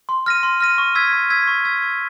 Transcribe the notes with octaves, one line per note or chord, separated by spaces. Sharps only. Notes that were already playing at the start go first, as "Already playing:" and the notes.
C6
F6 A#6 D#7
C6
F6 A#6 D#7
C#6
E6 G#6 B6
C#6
E6 G#6 B6
C#6
E6 G#6 B6
C#6